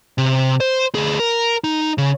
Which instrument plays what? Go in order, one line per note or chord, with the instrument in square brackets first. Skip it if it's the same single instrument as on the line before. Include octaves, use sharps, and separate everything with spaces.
[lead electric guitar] C3
C5
D2 G#4
A#4
D#4
C#3